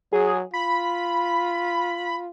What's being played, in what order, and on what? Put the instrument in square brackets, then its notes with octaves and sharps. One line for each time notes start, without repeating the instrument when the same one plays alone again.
[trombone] F#3 [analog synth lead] G#4
[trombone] F4 [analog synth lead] B5